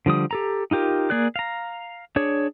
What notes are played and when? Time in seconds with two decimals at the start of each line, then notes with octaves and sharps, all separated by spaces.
0.06 D3 F3 G3 D#6
0.31 G4 A4 A#5
0.71 D#4 F4 G4 A#4
1.10 A#3 G#4 D5 F#6
1.36 F5 A#5
2.16 D4 G#4 C#5